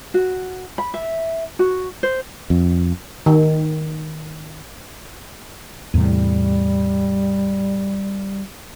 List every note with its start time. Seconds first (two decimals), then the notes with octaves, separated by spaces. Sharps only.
0.14 F#4
0.78 B5
0.94 E5
1.59 F#4
2.03 C5
2.50 F2
3.26 D#3
5.94 E2 A2 C3 G3